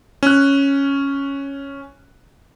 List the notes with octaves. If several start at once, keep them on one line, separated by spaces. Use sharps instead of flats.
C#4 F#6